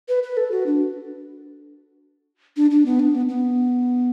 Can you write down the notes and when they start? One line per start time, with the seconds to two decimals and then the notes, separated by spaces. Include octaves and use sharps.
0.09 B4
0.23 B4
0.37 A4
0.52 F#4
0.66 D4
2.57 D4
2.71 D4
2.86 B3
3.00 D4
3.15 B3
3.29 B3